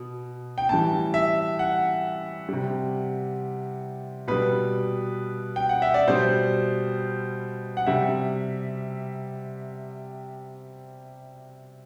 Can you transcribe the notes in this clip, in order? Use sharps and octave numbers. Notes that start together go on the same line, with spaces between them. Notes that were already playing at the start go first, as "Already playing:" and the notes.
Already playing: B2
G5
A2 E3 G3 A5
E5
F#5
C3 G3
B2 G3 B4
G5
F#5
E5
D5
B2 G3 C5
F#5
C3 G3 E5